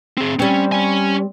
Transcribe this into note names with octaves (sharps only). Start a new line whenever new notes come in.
C4 G#4
G3 C4 C#4
C#4 G#5